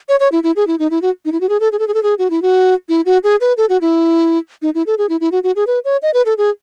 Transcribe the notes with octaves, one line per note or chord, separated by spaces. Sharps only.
C#5
C#5
E4
E4
G#4
E4
D#4
E4
F#4
D#4
E4
F#4
G#4
A4
G#4
A4
G#4
A4
G#4
F#4
E4
F#4
E4
F#4
G#4
B4
A4
F#4
E4
D#4
E4
A4
G#4
E4
E4
F#4
F#4
G#4
B4
C#5
D#5
B4
A4
G#4